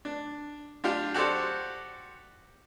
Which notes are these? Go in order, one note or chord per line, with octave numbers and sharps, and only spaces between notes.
D4
D4 F4 G4
F#4 G4 A4 C5 D5